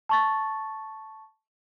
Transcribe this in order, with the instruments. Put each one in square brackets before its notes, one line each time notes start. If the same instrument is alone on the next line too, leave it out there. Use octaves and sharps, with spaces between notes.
[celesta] A5 C#6 A6